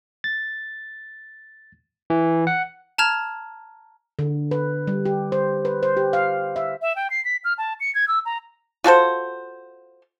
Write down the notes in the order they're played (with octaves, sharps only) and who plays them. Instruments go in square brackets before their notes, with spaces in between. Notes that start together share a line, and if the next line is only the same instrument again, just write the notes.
[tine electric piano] A6
E3
F#5
[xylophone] A5 A#5 F6 G#6
[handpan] D3
B4
G3
G4
C5
B4
C5
G4
F5
E5
[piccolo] E5
G5
C7
B6
F6
A5
C#7
G#6
E6
A#5
[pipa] F4 F#4 A4 C5